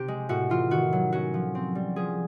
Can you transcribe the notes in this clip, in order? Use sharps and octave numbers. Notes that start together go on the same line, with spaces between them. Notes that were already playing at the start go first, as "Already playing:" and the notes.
Already playing: C3 G4
G#3
A2 F#4
E3 F4
D#3 F#4
F#3
C#4 F#4
F3
C4
G3
F3 G#4